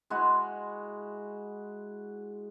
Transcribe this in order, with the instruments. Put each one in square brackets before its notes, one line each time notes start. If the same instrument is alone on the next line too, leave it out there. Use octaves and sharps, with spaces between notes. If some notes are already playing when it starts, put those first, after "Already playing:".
[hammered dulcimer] G#3 E4 F#4